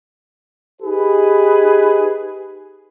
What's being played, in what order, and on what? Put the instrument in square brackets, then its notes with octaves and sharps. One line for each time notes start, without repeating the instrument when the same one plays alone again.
[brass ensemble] D#4 G4 G#4 B4